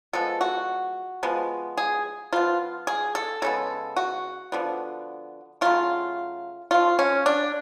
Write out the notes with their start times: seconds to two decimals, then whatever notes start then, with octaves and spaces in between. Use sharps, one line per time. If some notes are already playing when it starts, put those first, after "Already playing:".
0.13 F3 G#3 B3 A4
0.41 F#4
1.23 F3 G#3 B3
1.77 G#4
2.33 F3 B3 F4
2.87 G#4
3.15 A4
3.42 C#3 G#3 B3 A4
3.96 F#4
4.52 D3 F3 B3
5.61 C#3 F#3 A3 F4
6.71 F3 A3 F4
6.99 C#4
7.26 D4